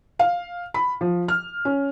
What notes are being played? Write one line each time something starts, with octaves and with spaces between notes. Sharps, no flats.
F5
B5
F3
F6
C#4